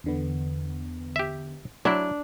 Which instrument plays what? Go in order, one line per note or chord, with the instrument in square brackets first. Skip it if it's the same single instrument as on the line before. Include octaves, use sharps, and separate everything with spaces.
[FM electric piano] E2 D3 B3
[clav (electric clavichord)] G4 E5
[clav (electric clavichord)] F#3 E4 [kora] D4